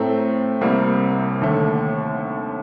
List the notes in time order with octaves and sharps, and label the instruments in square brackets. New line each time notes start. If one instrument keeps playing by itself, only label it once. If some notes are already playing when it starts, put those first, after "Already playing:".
Already playing: [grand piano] A2 A3 C4 A#5
C2 C3 G3 A#3
D#2 D3 A3